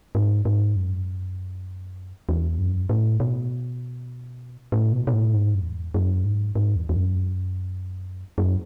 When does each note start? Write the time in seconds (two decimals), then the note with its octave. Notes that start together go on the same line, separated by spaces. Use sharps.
0.15 G#2
0.45 G#2
0.76 F#2
2.29 E2
2.59 F#2
2.89 A2
3.20 B2
4.72 A2
4.92 B2
5.07 B2
5.13 A2
5.34 G#2
5.55 F#2
5.63 E2
5.94 F#2
6.25 G#2
6.55 G#2
6.76 E2
6.89 E2
6.96 F#2
8.38 F#2